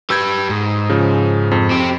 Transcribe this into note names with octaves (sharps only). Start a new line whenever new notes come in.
G4 B4 E6 G6 G#6
G#2
C#3 F3
F2
C4 G4